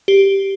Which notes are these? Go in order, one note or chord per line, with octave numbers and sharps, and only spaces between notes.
G4